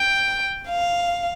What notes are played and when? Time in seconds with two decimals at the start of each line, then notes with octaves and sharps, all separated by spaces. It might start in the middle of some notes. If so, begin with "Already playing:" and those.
Already playing: G5
0.69 F5